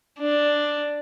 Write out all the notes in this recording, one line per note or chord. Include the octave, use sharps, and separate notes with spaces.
D4